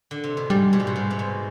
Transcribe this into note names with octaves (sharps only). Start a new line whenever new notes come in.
D3
C3
B2
G#2 G3
B2
C3
B2
G#2
C3
B2